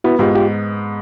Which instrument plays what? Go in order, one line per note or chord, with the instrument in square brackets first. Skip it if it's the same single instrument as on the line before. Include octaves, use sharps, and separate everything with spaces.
[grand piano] B3 [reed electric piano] E4 F#4
[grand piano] G#2 [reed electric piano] F4 G4
[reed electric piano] F4 G4